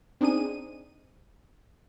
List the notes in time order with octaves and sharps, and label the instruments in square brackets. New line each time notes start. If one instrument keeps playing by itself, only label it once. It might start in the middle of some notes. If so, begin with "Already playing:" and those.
[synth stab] C4 D4 D#4 G#4 D#7